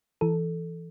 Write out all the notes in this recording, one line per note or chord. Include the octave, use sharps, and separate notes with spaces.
E3 A4